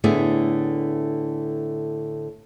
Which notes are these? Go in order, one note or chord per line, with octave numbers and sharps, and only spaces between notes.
A2 D3 A3 B3 E4 G#4